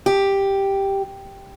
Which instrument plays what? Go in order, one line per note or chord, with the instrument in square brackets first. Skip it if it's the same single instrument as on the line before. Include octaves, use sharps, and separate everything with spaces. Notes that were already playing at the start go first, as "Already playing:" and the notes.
[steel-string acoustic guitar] G4